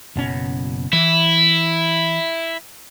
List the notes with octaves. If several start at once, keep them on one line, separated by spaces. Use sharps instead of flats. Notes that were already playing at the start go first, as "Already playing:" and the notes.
F#1 B2 C#4
E3 E4